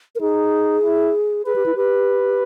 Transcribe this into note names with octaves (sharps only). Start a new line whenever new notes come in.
A#4
D#4 G#4
E4
G#4 B4
G4
E4
G4 B4